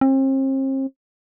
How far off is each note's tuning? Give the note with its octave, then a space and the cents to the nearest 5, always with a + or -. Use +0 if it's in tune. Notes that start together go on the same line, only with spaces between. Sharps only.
C4 +40